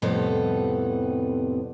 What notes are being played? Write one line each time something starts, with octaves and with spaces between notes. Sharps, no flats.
F2 A2 C3 G3 B3 A4